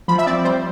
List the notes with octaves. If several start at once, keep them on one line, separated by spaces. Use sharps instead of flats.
F3 B5
E5
C4 D5
G3 C5